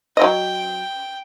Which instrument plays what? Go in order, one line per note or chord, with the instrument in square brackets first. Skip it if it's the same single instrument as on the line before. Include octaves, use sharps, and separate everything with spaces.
[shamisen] F#3 D#5 [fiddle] G5